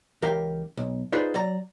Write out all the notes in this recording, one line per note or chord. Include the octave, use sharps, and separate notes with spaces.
C#2 E3 G4 A#4 F5 G5
B1
D#4 F4 G#4 B4 C5 D5
F#3 D5 A#5